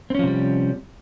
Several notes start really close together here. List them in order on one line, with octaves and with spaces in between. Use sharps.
C4 C#4 F3 C3 G3